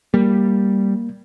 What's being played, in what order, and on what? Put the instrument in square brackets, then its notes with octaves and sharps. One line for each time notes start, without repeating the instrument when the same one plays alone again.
[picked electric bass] G3 [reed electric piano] A#3